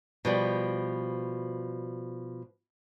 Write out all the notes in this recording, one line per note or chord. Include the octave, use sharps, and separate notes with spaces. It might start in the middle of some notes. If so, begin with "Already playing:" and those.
B2 F3 G3